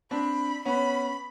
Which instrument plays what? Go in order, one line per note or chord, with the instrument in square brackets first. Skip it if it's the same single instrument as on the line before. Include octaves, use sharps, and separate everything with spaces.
[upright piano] C4 D4 [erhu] B5
[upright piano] B3 C#4 [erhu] B5